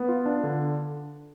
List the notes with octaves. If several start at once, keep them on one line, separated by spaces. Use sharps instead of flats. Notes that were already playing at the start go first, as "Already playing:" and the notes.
Already playing: B3
F4
D4
D3